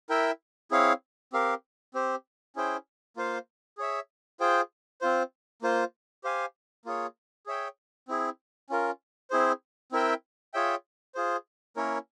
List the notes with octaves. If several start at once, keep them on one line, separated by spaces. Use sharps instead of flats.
E4 A#4 E5 G5
C4 E4 G#4 C#5 F5
C4 G4 A#4 F5
C4 G4 C5
C#4 E4 G#4 C5 G5
A#3 F4 C5 F5
G#4 C#5 E5
F4 G#4 C5 G5
C4 F4 C5
A#3 F4 C5
G4 C5 F5 G#5
A#3 F4 G#4 C#5
G#4 C#5 E5 G5
C4 E4 G#4
C#4 F4 A#4
C4 E4 G#4 C5
C4 E4 A#4 E5 G5
F4 G#4 C#5 E5 G5
F4 G#4 C5
A#3 C#4 E4 A#4 C#5